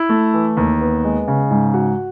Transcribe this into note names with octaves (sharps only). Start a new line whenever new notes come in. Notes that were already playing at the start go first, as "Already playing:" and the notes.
Already playing: E4
A3
E3
D#2
B3
G#3
C#3
G#2
F#4